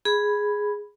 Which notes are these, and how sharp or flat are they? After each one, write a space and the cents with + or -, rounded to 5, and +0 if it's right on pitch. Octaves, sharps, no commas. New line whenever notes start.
G#4 +0 B5 +0